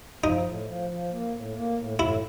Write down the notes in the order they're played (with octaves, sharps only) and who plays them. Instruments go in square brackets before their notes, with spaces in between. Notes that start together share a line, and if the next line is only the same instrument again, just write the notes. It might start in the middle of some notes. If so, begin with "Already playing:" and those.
[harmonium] F3 [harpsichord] D#4
[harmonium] A2
F3
F3
A#3
A2
A#3
A2
[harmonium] A2 [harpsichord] E4